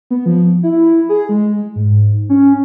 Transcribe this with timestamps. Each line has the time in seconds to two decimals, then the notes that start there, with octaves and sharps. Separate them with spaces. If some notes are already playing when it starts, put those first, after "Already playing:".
0.11 B3
0.26 F3
0.63 E4
1.09 G#4
1.29 G#3
1.76 G#2
2.29 C#4